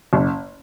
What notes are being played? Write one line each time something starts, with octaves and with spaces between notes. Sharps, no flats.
F#1